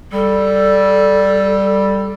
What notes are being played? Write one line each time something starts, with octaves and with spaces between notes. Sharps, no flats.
G3 A4